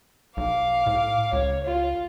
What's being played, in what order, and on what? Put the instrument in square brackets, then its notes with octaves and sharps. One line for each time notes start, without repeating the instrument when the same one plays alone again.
[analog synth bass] B1 [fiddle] F5 D6
[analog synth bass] A2
[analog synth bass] C#2 [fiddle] C#5
[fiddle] F4